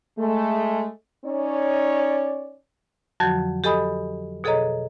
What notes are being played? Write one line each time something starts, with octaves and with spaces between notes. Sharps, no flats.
G#3 A3
C#4 D#4 C#5 D5
F2 D3 F3 F#3 F#4 G6
G4 A4 D#5 G#5 B5 D#6
B2 G#4 A4 C#5 D#5 A#5